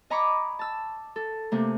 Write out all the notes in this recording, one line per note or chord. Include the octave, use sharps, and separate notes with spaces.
D#5 G#5 A#5 B5 C#6 D6
A5 E6
A4
C3 A3 A#3